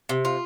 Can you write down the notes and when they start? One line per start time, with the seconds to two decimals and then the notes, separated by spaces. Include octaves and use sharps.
0.09 C3
0.25 F4